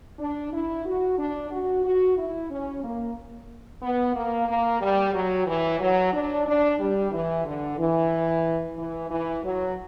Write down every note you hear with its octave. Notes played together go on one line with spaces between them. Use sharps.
D4
E4
F#4
D4
F#4
F#4
E4
C#4
A#3
B3
A#3
A#3
G3
F#3
E3
F#3
D4
D4
G3
E3
D3
E3
E3
E3
F#3